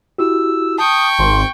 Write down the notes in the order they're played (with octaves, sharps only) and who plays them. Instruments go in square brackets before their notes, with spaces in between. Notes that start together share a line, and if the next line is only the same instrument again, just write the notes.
[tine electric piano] E4 F#4 G4 [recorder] E6
[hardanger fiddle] G5 C#6 [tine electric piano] A5 [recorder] D#6
[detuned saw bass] G#1 [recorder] C6